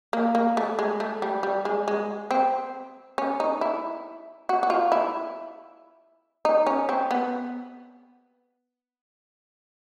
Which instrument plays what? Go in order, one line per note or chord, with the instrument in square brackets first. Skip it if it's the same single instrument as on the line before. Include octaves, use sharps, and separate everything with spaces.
[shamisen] A#3
A#3
A3
G#3
A3
G3
G3
G#3
G#3
C4
C#4
D#4
E4
F#4
F#4
F4
E4
D#4
C#4
C4
B3